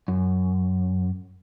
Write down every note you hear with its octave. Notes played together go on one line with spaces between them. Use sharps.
F#2